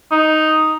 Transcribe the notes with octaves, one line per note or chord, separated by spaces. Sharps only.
D#4